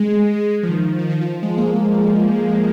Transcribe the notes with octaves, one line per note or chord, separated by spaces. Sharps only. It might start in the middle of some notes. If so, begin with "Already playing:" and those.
Already playing: G#3
F3
D#3
F3
D#3
F3
G#3
A#3